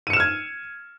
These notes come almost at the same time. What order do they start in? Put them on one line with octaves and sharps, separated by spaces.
D#7 C#7 E7 F6 G#6